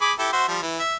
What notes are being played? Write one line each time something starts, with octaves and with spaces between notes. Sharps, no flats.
G#4 B5 D6
E4 G4 A4
F#4 C5 E5
F3 G3
E3
E5